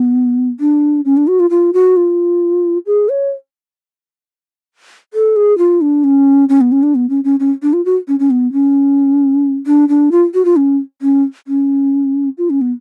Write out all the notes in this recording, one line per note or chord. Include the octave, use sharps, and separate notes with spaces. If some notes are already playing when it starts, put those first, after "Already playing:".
Already playing: B3
D4
C#4
D4
F#4
F4
F4
F#4
F4
G#4
C#5
A4
G#4
F4
D4
C#4
C#4
B3
C#4
D4
B3
C#4
C#4
C#4
D4
F4
F#4
C#4
C#4
B3
C#4
D4
D4
F4
F#4
F4
C#4
C#4
C#4
F4
C#4
B3